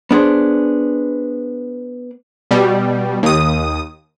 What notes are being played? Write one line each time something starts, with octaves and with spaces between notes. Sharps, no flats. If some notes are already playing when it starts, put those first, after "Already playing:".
B3 D4 G#4 C5
B2 G3
D#2 D#6